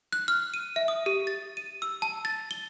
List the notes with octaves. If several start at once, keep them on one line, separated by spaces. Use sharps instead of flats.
F#6
F6
D#7
E5
D#6
G4
A6
D#7
E6
A5
A6
G7